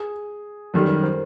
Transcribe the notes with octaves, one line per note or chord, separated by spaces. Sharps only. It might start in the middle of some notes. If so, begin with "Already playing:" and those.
Already playing: G#4
F#2 D#3 G3 A4
A#4
C5